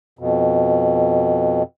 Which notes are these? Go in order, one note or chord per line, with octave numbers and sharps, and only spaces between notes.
F2 B2